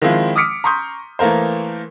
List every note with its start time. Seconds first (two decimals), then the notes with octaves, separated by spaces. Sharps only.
0.02 D#3 F3 G#3 C4 E4 F4
0.36 D6 D#6 F6 B6 C#7 D7
0.64 A#5 C6 C#6 D#6 G6
1.19 E3 A3 A#3 A#4 C5